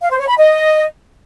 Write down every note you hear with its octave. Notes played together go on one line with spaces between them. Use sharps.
F5
C5
C#5
B5
D#5